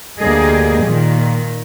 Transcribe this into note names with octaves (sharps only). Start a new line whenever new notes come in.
D2 A#3 G4 G#4 D#5
A#2 D#3